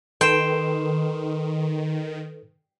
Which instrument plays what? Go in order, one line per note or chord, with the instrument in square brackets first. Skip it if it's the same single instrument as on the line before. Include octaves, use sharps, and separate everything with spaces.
[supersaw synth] D#3 [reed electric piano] A4 B4 [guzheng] G5 [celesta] C6 C7 E7